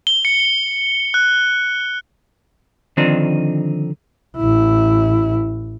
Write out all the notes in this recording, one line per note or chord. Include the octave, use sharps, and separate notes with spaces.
G7
C#7
F#6
D3 D#3 F3 C4 D4 D#4
A1 E4